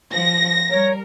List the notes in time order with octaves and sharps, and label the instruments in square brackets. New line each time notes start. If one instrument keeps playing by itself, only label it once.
[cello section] F3 [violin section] A#6
[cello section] G3 A#4 [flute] C#5